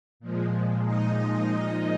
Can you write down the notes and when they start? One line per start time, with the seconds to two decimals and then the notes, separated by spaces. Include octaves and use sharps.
0.20 A#2 F3 G#3
0.84 D#4 D#5